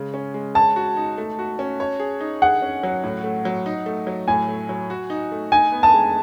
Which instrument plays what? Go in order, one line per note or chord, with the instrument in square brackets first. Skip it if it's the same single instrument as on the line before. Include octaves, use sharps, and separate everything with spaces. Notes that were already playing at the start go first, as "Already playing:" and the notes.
Already playing: [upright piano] C#3 G#3
C#4
G#3
[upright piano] C#5 [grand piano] A5
[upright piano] F#4
D#4
A3
F#4
C#4
C#5
G#4
D#4
[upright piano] G#4 [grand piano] F#5
[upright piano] C#4
F#3
A2
A3
F#3
D#4
A3
F#3
[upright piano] A2 [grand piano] G#5
[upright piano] A3
F#3
F#4
D#4
A3
[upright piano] D#4 [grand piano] G#5
[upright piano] B3
[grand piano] A5
[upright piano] G#3